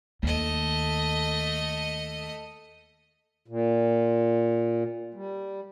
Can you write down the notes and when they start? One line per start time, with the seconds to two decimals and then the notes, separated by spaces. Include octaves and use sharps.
0.23 D#2 A3 D#5
3.48 A#2
5.14 G3